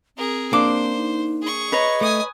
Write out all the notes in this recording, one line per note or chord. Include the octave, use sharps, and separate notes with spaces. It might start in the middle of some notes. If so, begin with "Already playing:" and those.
C4 G#4 A#4
A#3 D4 C5 D6
D#4
G#4 C#6
B4 C#5 D#5 A#5
A3 G#5 D#6